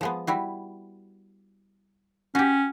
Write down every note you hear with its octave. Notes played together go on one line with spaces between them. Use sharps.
F3 G#3 B3
G3 E4 F#4
C#4 F#4 G4